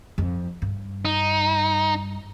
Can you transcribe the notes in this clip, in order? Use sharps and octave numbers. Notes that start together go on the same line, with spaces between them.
F2
G2
D#4